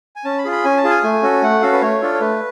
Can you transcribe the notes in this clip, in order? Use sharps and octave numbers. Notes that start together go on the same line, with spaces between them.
G#5
C#4 A5
B5
F4 G#4
B5
C#4 G#5
A5
F4 G#4
G#5
A3 G#5
C#4 F#4 A4
A3 F#5
C#4 F#4 A4 F5
B4
A3 C#5
D4 F4 A4
C#5
A3 B4